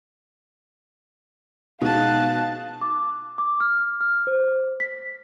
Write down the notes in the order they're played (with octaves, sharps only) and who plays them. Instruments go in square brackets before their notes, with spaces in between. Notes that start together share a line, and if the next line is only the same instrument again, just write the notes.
[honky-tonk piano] B2 G#3 [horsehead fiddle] D#4 A5 [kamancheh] F5 F#6
[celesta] D6
D6
F6
F6
C5
B6